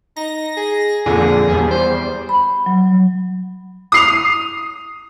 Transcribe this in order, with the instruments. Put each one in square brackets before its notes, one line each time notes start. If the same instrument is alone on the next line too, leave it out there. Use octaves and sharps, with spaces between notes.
[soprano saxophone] D#4 [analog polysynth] A#6
[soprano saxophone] G#4
[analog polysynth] F2 A#2 D3 [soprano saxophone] G#4
[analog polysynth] E2 G3
[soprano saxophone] C5
[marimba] B5
F#3
[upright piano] D#6 C7 F7